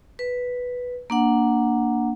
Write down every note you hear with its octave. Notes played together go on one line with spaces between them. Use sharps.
B4
A#3 D4 F#5